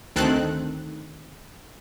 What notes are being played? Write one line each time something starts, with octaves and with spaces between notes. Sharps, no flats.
D2 D#3 C4 A4 F#6